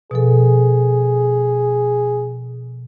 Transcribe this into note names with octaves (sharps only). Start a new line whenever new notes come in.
B2 F3 G#4 A4